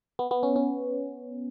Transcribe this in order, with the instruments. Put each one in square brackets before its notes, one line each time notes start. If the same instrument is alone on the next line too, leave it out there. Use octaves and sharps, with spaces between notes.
[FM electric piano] B3
B3
C#4
C#4